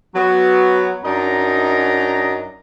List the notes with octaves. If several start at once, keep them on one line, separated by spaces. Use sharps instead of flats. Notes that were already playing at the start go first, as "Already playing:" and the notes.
F#3 B3
F#2 D4 D#4 D#5 A#5